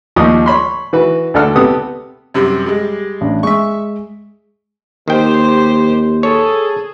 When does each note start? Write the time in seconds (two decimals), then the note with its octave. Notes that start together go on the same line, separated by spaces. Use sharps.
0.16 D#2 F3 C#6 D#6
0.46 C#5 B5 C6
0.93 E3 F#4 B4
1.34 D2 D4 A4 F#5 F6
1.55 C3 B3 G4 A4 D#6
2.34 F#2 C3 G3
2.66 G3 G#3
3.21 A1 D4
3.43 G#3 E5 C#6
5.08 D#2 D#3 G4 C5 G5
6.23 G#4 A4 C#5